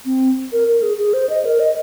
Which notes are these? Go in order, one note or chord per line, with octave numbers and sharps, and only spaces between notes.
C4
A#4
A#4
G#4
G#4
C5
D#5
A#4
D#5